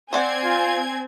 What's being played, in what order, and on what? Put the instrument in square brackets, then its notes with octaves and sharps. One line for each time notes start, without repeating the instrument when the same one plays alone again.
[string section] C4 G#6 [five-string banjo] C5 D5 F#5 [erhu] G#5
[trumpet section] F4